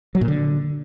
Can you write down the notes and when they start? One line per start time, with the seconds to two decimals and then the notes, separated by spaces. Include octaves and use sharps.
0.15 F#3
0.21 A#2
0.28 D3